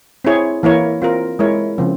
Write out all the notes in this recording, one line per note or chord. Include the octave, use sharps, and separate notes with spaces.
C4 E4 G#4 C#5
E3 A#3 E4 A#4 C#5
C4 F4 A#4
G#3 E4 A#4 C#5
C#3 F3 C4